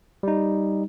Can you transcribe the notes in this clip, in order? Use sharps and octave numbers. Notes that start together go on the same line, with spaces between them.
G3 D#4